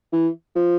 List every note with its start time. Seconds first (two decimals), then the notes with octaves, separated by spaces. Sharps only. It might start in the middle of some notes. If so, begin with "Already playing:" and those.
0.13 E3
0.55 F3